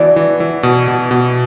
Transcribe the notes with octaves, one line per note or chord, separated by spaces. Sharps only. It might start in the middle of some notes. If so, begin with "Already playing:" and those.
Already playing: E3 B3 F#4 D5
E3
E3
B2
B2
B2